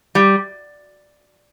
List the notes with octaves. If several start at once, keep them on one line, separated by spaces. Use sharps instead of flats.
G3